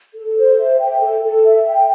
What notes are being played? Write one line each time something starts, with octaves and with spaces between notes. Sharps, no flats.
A4
C5
E5
G5
A4
A4
E5
G5